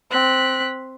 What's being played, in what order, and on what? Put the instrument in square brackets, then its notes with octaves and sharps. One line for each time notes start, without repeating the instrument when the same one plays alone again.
[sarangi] C4 [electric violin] F#6 B6